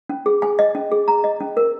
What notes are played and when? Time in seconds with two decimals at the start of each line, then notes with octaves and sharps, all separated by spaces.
0.09 C#4
0.26 G#4
0.42 G#5
0.59 D#5
0.75 C#4
0.92 G#4
1.08 A#5
1.24 D#5
1.40 C#4
1.57 A#4